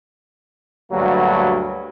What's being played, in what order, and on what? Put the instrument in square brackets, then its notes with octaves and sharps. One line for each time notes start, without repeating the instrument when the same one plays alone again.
[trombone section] D2 G2 F#3 G3 A#3 F#4